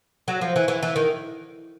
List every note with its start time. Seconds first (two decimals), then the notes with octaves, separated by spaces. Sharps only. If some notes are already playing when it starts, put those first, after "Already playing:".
0.28 F#3
0.41 F3
0.56 E3
0.68 E3
0.83 E3
0.96 D#3